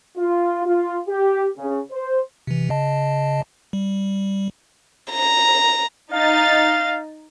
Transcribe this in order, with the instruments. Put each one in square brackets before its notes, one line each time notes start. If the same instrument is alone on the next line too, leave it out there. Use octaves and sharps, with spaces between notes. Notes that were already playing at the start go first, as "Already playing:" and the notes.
[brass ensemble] F4
F4
G4
C#3
C5
[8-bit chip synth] C3 E3
C#3 D#5 A5
G3
[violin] A#5
[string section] D#4 A6 [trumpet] F5